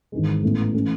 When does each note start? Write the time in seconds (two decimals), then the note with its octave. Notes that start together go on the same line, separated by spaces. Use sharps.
0.12 G#1 G#2 E3 G#3
0.43 A1 A2 E3 B3
0.74 E3 A3 C#4